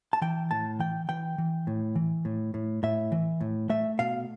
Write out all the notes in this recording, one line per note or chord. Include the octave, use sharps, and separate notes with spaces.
A5
E3 G5
A2 A5
E3 G5
E3 G5
E3
A2
E3
A2
A2
A2 E5
E3
A2
A3 E5
B2 F5